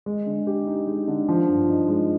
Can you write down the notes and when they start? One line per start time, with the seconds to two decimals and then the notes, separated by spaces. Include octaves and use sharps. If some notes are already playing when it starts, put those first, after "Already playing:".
0.06 G#3
0.26 D3
0.47 G4
0.67 D#4
0.87 G#3
1.08 D3
1.29 F3
1.48 G2
1.69 D#4
1.88 G#3